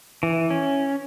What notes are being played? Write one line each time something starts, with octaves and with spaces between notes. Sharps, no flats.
E3
C#4